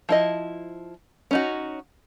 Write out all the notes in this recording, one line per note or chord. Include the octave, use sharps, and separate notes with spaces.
F3 E4 D#5
C#4 D#4 F#4